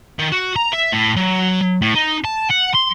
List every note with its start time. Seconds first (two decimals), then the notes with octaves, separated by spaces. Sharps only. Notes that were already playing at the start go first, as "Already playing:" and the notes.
0.19 D#3
0.32 F#4
0.56 A#5
0.73 E5
0.92 A2
1.16 F#3
1.82 A2
1.95 D#4
2.24 A5
2.50 F#5
2.74 C6